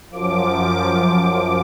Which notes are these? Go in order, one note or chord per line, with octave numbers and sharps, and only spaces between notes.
F#2 F3 D6